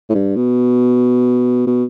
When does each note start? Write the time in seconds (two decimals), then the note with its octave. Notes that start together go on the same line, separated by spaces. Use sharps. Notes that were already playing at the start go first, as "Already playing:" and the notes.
0.10 A2
0.15 G2
0.36 B2
1.67 B2